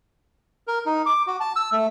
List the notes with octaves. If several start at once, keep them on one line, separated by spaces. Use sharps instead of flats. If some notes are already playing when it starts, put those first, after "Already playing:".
A#4
D#4
D6
F#4
A5
E6
A3